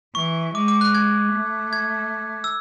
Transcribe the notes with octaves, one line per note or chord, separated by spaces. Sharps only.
E3 C#6
G#3 D6
D6
F#6
G#6
A3
G#6
E6